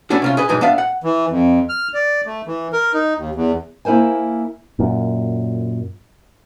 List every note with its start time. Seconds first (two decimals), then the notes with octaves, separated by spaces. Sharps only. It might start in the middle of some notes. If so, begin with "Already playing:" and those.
0.10 A3 B3 C#4 D4 F#4
0.22 C3 C#4 F4
0.37 G#4 B4 D#5
0.49 B1 G2 E3 G#3 D#4
0.61 B3 D4 E5 F5
0.78 F#5
1.03 E3
1.30 F2
1.69 F6
1.94 D5
2.26 A3
2.47 E3
2.73 A#4
2.94 D#4
3.17 D#2
3.35 E2
3.85 A#3 E4 A#4 C5 G#5
4.79 F#2 A#2